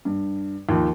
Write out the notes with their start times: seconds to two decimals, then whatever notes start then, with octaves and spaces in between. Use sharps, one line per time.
0.05 G2
0.69 D#2 F3